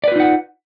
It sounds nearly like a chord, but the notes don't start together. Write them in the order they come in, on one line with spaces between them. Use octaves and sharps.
D5 B4 F4 D#4 F#5